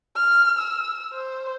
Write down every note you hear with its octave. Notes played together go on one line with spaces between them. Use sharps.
F6
E6
C5